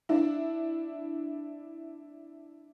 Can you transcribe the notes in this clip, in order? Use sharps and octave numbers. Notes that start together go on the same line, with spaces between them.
D4 E4